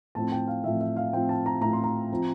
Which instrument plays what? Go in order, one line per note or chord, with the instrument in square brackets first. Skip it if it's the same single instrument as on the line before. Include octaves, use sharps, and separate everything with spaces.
[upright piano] A2 F3 C4 A5
G5
F5
A2 F3 C4 E5
E5
F5
A2 F3 C4 G5
A5
A#5
A2 F3 C4 A#5
C6
A#5
F3 C4